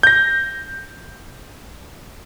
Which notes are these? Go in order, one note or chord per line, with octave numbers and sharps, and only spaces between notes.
G6 A#6